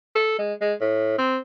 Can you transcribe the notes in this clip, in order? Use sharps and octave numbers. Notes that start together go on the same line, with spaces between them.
A4
G#3
G#3
A2
C4